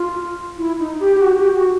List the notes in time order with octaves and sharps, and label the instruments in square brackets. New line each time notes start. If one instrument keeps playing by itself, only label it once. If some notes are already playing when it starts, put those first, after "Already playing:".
Already playing: [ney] F4
E4
D#4
G4
G4
F#4
G4
F#4